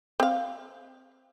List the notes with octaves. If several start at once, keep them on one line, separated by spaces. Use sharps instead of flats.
C4 F5